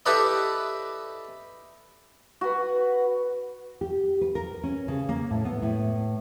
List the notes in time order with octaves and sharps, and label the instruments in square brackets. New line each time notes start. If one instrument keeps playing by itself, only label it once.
[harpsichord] E4 G4 A4 B4 D5 D#5
[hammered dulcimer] F#4 B4
[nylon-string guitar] G4
B4
A#4
C#4
C#3
A#3
A2
B3
A2